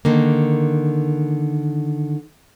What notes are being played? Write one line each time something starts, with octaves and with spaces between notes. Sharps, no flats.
D3 D#3 A#3